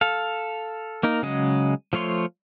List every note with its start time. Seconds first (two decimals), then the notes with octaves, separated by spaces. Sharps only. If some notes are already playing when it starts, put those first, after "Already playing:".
0.01 A4 F5
1.03 A#3 D#4 A#4
1.23 C#3 F#3 G#3 D#5
1.93 F3 A3 F4 C#5 C6